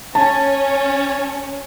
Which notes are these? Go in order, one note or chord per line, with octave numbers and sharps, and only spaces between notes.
C#4 A5